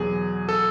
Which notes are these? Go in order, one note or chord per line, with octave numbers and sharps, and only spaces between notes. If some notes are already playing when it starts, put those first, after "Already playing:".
Already playing: E2 B2 F#3 G#4
A4